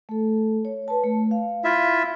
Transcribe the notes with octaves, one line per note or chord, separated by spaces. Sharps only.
A3 A4
C#5
B4 A5
A3
F5
E4 F4 E5